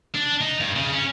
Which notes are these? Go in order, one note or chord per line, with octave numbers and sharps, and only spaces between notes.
D4
D#4
G2
C#3
C#4